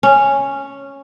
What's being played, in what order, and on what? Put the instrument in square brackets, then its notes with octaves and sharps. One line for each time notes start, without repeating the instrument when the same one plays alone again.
[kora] C#4